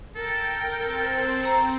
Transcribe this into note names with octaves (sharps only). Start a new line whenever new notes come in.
A4 A#4 G5
C4 A4
A#5